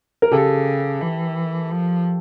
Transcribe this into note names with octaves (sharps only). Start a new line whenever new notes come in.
A#4
C#3 G4 A4
E3
F3